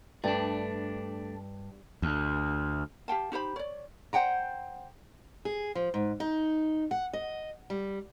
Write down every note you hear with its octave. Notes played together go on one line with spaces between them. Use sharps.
G2 A3 D4
D2
G4 F5 G5 A5
D#4 G4 C5 B5
C#5 D5
C5 F#5 G5 A#5
G#4
F3
G#2
D#4
F#5
D#5
G3